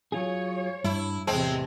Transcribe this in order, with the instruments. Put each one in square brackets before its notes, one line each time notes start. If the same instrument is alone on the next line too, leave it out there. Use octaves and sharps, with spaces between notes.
[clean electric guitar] F#3 F4 G#4 [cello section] C#5
[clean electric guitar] G2 [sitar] E4
[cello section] E2 A2 C3 [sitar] G#3 C4 [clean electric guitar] A5